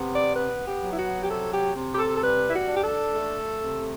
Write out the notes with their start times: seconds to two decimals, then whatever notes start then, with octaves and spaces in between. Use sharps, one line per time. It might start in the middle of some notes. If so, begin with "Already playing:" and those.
Already playing: C3 B3
0.13 D5
0.36 B3 B4
0.68 G4
0.82 F#3
0.92 E4
0.99 F#4
1.23 G4
1.29 C3 A4
1.52 G4
1.75 C3
1.94 G4
1.98 A4
2.16 A4
2.21 G3 B4
2.48 E4
2.52 F#4
2.68 D4
2.76 G4
2.83 A4
3.14 A3
3.61 C3